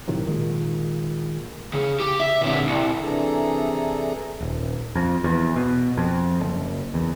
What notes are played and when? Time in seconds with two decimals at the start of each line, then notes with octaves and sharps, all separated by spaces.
0.08 A2 C3 D#3 F#3
0.26 A#2 D#3 G#3 A#3
1.73 C#3
2.00 G4
2.20 E5
2.41 A#2 D3
2.67 C2
2.98 C3 E3 D4 G#4 A4 A#5
4.41 D#1
4.95 F2
5.24 E2
5.56 B2
5.97 F2
6.41 F#1
6.94 E2